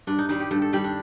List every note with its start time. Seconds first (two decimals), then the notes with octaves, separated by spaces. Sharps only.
0.07 G2 D4
0.18 D#4
0.29 D#3 G3 D#4
0.40 G4
0.51 G2 A4
0.62 A4
0.73 D#3 G3 G4
0.84 D4